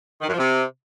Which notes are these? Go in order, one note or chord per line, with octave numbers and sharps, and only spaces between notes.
D#3
F#2
F3
C3